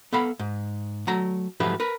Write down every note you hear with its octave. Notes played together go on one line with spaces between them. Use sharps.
B3 A4 F5 B5
G#2
F#3 A3 A#5
G#2 F3 F#3 A3 G4 B4
A#4 B4